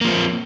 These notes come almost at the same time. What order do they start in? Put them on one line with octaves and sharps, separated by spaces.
A#3 F3 C4